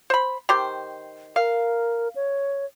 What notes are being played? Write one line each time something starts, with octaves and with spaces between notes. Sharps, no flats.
C5 B5
D#3 G4 C5
A#4 F5
C#5